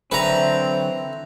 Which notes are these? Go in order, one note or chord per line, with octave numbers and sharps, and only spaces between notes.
D3 E3 F#3 C4 B4 E5 A#5 C#6